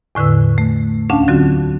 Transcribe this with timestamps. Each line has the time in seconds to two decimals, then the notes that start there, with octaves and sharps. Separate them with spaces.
0.15 E2 A2 D3 B4 E6
0.58 A3
1.10 D2 C#4 D4 F5 F#5 A5
1.28 D3 F#3 C4 F4 F#4